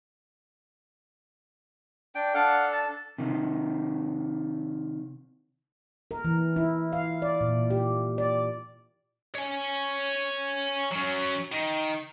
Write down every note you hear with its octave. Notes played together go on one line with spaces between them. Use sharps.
D4 G5
D4 A4 F5 F#5
A5
C3 D#3
A#4
E3
E4
F5
D5
A#2
G4
D5
C#5 G#5
F#3 C#4
D#3